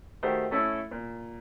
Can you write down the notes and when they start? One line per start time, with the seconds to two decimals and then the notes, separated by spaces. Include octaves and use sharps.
0.23 D#3 A3 F#4 G4 C5
0.51 A3 C#4 E4 A4
0.91 A#2